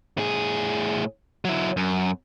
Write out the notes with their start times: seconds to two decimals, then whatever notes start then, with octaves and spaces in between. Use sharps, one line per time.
0.18 A2 G#4
1.45 F#3 E4
1.77 F#2